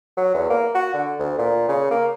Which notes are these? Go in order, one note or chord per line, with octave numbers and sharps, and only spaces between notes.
F#3
E2
A#3
F#4
D3
D2
A#2
C#3
A#3